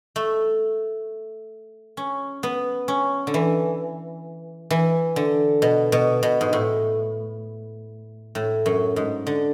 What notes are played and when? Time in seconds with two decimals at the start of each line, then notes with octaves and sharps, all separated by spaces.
0.16 A3
1.97 C#4
2.43 B3
2.88 C#4
3.27 D3
3.34 E3
4.70 E3
5.16 D3
5.62 B2
5.92 B2
6.23 B2
6.41 G#2
6.53 A2
8.35 A2
8.66 F#2
8.96 G#2
9.27 D3